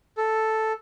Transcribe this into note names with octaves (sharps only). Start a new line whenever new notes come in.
A4